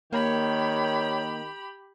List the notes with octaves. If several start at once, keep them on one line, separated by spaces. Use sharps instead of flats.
D#3 A#3 G4 C#5 B5